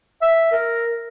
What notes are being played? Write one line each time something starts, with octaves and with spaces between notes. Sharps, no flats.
E5
A#4